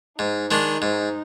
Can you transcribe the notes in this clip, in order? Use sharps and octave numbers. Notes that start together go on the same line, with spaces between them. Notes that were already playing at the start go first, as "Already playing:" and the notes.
G#2 D#4
D#3 G#3 D4
G#2